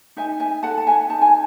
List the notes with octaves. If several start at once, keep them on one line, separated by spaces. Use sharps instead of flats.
D#4 E5 G#5
E5 G#5
A4 F#5 A5
A5
E5 G#5
D#4 A5
G#5